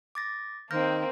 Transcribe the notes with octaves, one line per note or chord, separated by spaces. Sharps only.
D6 A6 A#6
D#3 A#3 C4 F6 G6 A#6